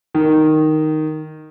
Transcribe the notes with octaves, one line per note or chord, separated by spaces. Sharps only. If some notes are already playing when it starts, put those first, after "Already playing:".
D#3